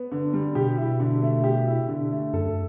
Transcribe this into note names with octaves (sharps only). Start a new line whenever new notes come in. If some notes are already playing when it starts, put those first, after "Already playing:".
Already playing: B3
D3
G3
B2 G4
E4
D3
A3
G4
E4
D3
A3
F#2 A4